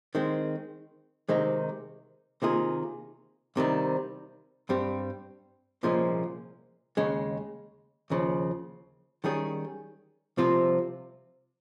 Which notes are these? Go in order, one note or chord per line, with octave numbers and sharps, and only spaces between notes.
D#3 G#3 C4
C3 D#3 G#3 C4 D#4
C3 D#3 A#3 F4 G#4
C2 C3 D#3 G3
G2 G3 C4 G4
C2 A#2 F3 G#3 C#4
D#2 C#3 G#3 C#4
D#2 C#3 F3
D#3 G3 C#4 G#4
C2 C3 F3 C4 F4